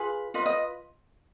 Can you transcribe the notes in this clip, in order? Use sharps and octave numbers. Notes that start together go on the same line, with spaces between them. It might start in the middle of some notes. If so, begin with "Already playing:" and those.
Already playing: F4 G#4 B4
F4 B4 D#5
D#5